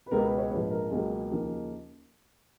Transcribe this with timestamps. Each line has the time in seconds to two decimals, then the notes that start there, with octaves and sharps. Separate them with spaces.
0.06 B4
0.11 C#2 B2 G#3 B3 A#4
0.25 B4
0.38 C#5
0.51 A#1 G#2 F3 B4
0.71 A#4
0.91 C#2 B2 F#3 A#3 G#4
1.31 D#2 C#3 F3 A#3 D#4